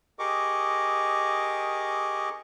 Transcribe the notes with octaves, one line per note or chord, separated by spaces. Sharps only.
G4 G#4 A#4 D#5 C#6 D6